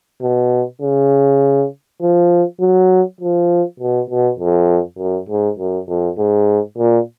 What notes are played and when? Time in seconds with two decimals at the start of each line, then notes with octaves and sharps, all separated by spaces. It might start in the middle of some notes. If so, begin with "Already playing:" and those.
0.22 B2
0.82 C#3
2.02 F3
2.60 F#3
3.21 F3
3.80 B2
4.10 B2
4.39 F2
4.99 F#2
5.29 G#2
5.59 F#2
5.89 F2
6.18 G#2
6.78 A#2